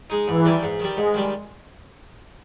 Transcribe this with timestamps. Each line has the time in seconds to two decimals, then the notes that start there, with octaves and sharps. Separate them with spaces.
0.10 G#3 D#4
0.28 G#2 E3
0.45 D#3 G3
0.63 G#2
0.80 D#3 G3
0.97 G#2 G#3
1.14 D#3 G3